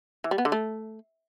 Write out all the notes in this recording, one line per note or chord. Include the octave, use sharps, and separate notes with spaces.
E3
G3
B3
D3
A3